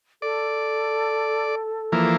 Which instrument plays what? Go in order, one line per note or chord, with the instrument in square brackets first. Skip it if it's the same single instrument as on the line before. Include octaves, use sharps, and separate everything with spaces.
[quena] A4 [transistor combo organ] D5
[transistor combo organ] E3 F3 A#3